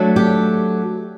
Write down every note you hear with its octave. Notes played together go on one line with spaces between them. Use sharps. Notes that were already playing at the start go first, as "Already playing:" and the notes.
Already playing: F#3 A3 D4
G4